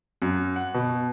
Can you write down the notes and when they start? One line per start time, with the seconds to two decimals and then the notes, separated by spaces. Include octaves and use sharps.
0.22 F#2
0.56 F#5
0.74 B2